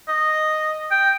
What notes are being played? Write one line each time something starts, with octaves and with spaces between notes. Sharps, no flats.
D#5
G5